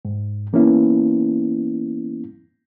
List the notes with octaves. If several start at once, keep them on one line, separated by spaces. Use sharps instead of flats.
G#2
E3 A#3 B3 C#4 E4